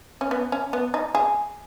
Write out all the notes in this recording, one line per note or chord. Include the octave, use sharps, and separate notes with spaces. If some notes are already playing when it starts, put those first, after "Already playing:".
C#4
B3
C#4
B3
D#4
G#4